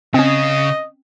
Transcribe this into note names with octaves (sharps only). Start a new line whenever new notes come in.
C#3 C4 C#4 D#5